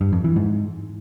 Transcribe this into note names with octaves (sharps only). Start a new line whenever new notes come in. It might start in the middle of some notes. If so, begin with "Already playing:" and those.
G2
F2
E3
G#2